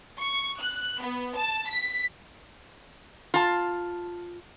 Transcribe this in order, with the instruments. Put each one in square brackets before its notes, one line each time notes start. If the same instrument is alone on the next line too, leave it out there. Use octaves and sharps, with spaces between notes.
[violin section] C#6
F#6
B3
A5
B6
[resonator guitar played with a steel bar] F4 A5